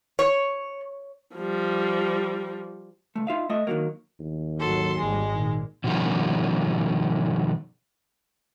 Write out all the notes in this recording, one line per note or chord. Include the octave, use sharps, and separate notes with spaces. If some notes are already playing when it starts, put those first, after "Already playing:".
C#5
F3 G3
C#2 A3
D#4 F4 E5 F5
A3 D#5 E5
D#3 E3 F#3 A#3
D#2
G#1 F#3 A4 C6
G#1 G3 G#3
A#2 D#3
B2 D3 D#3 F3 G3 C#4